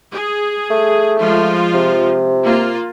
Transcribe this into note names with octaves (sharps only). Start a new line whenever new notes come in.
G#4
A3
F3 G#3 F4
C3
A#3 F4